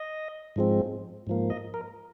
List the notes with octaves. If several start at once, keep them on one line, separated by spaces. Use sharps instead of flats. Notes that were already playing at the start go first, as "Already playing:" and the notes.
Already playing: D#5
G#2 F3 G#3 C4
G#2 F3 A#3
D#5
A#4